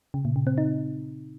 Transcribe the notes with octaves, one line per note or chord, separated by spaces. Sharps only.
C#3
A#2
C#3
C4
D#4